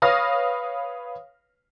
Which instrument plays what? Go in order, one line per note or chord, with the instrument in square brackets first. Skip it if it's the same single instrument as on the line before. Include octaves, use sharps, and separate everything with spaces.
[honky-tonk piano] B4 C#5 F5 D#6 F6 A#6